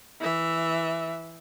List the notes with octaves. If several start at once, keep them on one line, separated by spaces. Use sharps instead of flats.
E3 E5